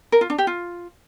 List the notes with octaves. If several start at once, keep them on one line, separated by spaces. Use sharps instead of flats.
A#4
F4
D4
G4
F4